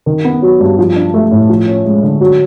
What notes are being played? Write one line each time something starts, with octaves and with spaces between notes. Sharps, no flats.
D#3
B3
F#3
G2
F3
D4
A3
A2
F3
C#4
G#3
D3
F#3